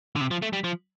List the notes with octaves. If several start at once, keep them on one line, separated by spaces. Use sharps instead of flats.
D3
C3
F3
A3
G3
F3